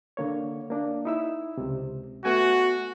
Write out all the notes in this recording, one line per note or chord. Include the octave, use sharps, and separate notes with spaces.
D3 A#3 C#5
A#3 D4
D#4 E4 E6
C#2 C3
A3 B3 F#4 G#5